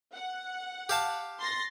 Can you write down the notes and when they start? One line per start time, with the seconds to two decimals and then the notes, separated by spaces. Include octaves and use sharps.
0.14 F#5
0.89 G4 F5 A5
1.39 C6 A6 A#6